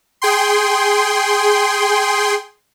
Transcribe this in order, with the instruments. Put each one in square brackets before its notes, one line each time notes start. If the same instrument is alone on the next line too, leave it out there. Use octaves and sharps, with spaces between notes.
[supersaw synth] G#4 G5 C6